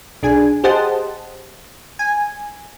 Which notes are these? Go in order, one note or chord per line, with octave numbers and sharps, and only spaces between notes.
B1 D4 G#4 G#5
G4 G#4 C5 D#5 F#5 A5
G#5